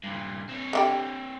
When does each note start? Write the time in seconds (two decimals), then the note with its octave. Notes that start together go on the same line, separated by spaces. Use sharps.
0.04 G2 A#2
0.49 C4 C#5
0.73 D3 E4 G4